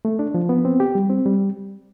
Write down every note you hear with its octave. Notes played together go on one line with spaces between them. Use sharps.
A3
D4
F3
B3
C4
G4
G3
C4
G3